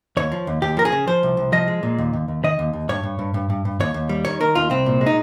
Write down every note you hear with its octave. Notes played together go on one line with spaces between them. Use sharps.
D#2 C#5
F3
D#2
D#2 G4
F3 A#4
G#4
C#3
F3 C5
C2
C2
F3 D#5
G#3
A#2
D#2
D#2
D#2
D#3 D#5
D#2
D#2
G2 C#5
G2
G2
G2
G2
G2
D#2 C#5
D#2
G3
D#3 C#5
D#3 A#4
D#2 F4
C2 C4
A#2
G#3
D#4